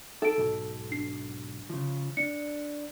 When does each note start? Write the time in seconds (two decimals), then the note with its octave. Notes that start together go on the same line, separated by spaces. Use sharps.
0.22 D#4 A4 D7
0.38 B1 G#2
0.91 D4 C7
1.70 C#3 F3
2.17 D4 C#7